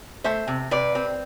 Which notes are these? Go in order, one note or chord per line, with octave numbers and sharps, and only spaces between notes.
A3 C5 E5
C3
C3 B4 D5
C4